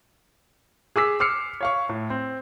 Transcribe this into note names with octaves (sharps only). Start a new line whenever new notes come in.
G#4 D6 E6 B6
D6 E6 F6 C7 C#7
C#5 F5 C#6
A2
C4